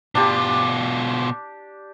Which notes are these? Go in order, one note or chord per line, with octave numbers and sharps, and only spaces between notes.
B2 D4 F4 G4